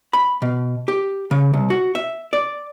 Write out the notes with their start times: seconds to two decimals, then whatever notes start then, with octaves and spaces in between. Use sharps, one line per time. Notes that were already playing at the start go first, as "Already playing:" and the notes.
0.13 B5
0.42 B2
0.88 G4
1.31 C#3
1.54 C2
1.70 F#4
1.95 E5
2.33 D5